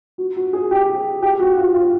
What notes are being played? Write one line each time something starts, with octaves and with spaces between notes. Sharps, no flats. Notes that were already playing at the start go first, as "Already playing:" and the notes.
F#4
F#4
G#4
G4
G4
F#4
F4
F4